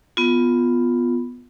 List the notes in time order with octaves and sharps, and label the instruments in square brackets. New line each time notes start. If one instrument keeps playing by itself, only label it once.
[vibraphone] B3 F4